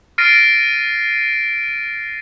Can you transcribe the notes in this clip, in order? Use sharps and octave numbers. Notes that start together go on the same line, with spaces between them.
F6 A6 A#6 C7 D7 D#7